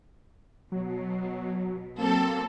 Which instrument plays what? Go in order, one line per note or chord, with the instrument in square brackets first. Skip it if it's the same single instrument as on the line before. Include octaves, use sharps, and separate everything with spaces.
[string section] B2 [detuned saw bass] F#3
[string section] F#3 C4 A4 [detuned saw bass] A#3